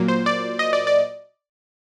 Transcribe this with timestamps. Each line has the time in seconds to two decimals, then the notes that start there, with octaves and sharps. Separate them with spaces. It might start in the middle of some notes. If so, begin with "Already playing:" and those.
Already playing: A#2 F#3 A#3
0.08 C5
0.26 D5
0.59 D#5
0.73 D5
0.87 D5